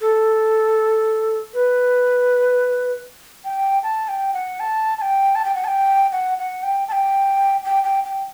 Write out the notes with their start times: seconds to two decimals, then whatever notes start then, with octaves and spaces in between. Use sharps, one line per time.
0.01 A4
1.54 B4
3.45 G5
3.83 A5
4.08 G5
4.34 F#5
4.60 A5
4.98 A5
5.02 G5
5.35 A5
5.45 G5
5.55 F#5
5.64 A5
5.68 G5
6.12 F#5
6.38 F#5
6.63 G5
6.88 A5
6.92 G5
7.65 G5
7.84 G5
8.04 G5